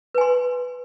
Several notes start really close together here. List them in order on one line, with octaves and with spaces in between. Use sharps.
B4 G#5 C6